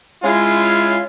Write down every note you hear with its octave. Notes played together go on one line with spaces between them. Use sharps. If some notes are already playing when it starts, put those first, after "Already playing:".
G#3 C#4 E4 F4